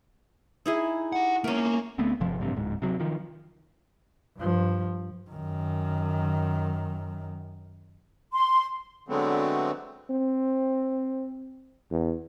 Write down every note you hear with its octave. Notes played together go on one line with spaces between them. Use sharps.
D#4 E4 G#4
G4 F#5
A3 A#3 C#4 A#4
D2 A3 B3 C4
G1 C3 F3
A1 G2 C3
D1 G#2
C3 F#3
D#3 F3
G2 F3
F#2 D#3
C6
D3 F#3 G#3 A3 B3 C4
C4
E2